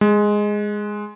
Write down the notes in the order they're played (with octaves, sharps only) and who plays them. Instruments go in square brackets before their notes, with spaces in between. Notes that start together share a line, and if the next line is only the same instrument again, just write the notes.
[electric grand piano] G#3